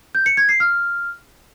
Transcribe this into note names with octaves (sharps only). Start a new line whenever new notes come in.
G6
C#7
G#6
C7
F6